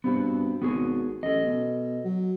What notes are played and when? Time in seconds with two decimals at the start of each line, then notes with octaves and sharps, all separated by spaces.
0.04 G2 B3 C4 F#4
0.62 G#1 B3 F#4 G#4
1.23 A1 A4 D#5
1.45 B2
2.04 F#3